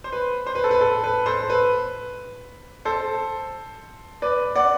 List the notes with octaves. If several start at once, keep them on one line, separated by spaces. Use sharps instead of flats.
C5
B4
C5
B4
A4
B4
A4
B4
A4 C5
B4
A4 C5
B4 D5
D5 F#5